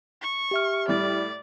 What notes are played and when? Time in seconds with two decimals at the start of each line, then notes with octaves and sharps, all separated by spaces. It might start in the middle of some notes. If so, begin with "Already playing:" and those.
0.21 C#6
0.51 G4 E5 F6
0.88 A2 G3 D5